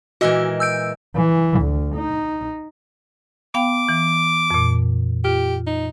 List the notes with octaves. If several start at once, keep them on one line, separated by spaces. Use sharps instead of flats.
A#2 E3 G#3 F#4 D#5 E6
E6 G6 D7
E3
D2
D#4
B3 F5 G5 D6
E3
F2 A#2
F4 G4
D#4